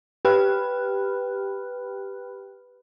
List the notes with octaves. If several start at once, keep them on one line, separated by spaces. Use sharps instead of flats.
G4 B4 G5 B5 F6 F#6